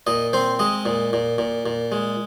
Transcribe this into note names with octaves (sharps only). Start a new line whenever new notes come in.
A#2 D#5
C4 C5
G#3 D#5
A#2
A#2
A#2
A#2
G#3